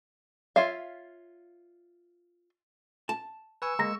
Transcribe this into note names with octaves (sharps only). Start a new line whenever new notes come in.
F4 C#5 E5 F5
A5
B4 G#5 C#6 E6
G#3 A#3 A#5 A#6